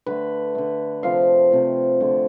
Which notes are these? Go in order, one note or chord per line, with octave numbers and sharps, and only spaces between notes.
D3 A3 B4
D3 A3
C3 F3 A3 F5
C3 F3 A3
D3 F3 A3